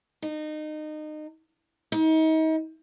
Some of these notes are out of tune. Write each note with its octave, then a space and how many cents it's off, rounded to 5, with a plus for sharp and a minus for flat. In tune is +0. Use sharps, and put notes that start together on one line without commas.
D#4 -25
D#4 +35